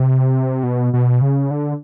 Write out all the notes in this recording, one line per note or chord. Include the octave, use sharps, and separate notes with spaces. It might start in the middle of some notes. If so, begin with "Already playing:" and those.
Already playing: C3
B2
B2
C#3
D3